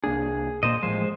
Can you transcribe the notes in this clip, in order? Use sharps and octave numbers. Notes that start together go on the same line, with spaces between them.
C2 A#3 D4 G#4
A#2 A#3 C5 D#5
A1 A2 F3 G#3 C5